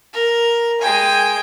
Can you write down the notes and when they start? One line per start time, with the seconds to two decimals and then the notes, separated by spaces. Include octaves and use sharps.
0.13 A#4
0.81 G#3 G5 G#5